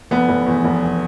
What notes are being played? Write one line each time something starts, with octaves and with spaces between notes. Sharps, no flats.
F1 B3
F1
E2
F1